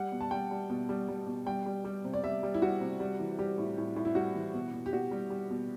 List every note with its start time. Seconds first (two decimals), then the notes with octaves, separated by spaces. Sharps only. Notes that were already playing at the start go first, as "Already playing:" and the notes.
Already playing: G3 F#5
0.12 B2
0.21 A5
0.31 G3 G5
0.51 G3
0.70 B2
0.89 G3
1.09 G3
1.27 B2
1.46 G3 G5
1.66 G3
1.85 G3
2.04 C3
2.14 D5
2.23 G3 E5
2.43 G3
2.54 E4
2.62 G3 F#4
2.81 C3
3.00 G3
3.20 E3
3.39 G3 G4
3.58 A2
3.78 A2
3.96 A2
4.05 E4
4.15 G3 F#4
4.35 E3
4.54 B2
4.73 B2
4.86 G4
4.93 B2 F#4
5.11 G3
5.30 G3
5.50 B2